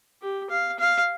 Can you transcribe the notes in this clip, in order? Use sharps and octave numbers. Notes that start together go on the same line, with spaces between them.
G4
F5
F5